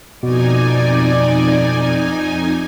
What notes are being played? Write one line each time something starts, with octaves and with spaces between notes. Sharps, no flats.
F2 B2 D#4 D5 G#5